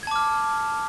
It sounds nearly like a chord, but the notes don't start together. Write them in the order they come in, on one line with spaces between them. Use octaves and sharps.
G#6 A5 D6 F6